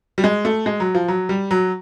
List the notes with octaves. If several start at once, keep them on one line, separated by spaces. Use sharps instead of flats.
G3
G#3
A3
G#3
F#3
F3
F#3
G3
F#3